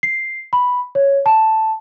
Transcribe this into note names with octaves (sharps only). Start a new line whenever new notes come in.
C7
B5
C#5
A5